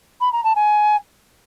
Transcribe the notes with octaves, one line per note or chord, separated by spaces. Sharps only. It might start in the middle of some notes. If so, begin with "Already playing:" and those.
B5
A#5
A5
G#5